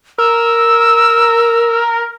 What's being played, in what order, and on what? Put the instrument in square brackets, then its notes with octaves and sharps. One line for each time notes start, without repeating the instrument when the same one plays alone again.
[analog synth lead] A#4 [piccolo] E6